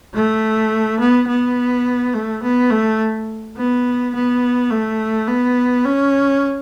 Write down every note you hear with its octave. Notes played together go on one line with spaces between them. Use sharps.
A3
B3
B3
A3
B3
A3
B3
B3
A3
B3
C#4